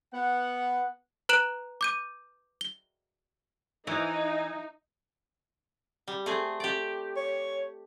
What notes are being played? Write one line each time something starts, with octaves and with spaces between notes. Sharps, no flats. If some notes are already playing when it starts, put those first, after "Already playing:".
B3 F#5
B4 A#5 F#6 D7 E7 F#7
D6 G6 D#7
G7
E3 D#4
G3
A3 C4 G#4
G4 D5
C#5